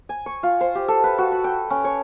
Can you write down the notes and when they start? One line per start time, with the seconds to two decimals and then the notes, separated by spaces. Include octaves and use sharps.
0.09 G#5
0.26 C#6
0.43 F4
0.60 C5
0.75 G4
0.88 A4
1.04 B4
1.18 F#4
1.32 B5
1.44 G5
1.70 C#4
1.84 C#5